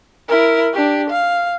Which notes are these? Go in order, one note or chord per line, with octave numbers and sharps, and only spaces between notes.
E4 A#4
D4 G4
F5